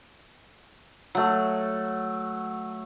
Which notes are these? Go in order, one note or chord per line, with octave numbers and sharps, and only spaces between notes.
F#3 A3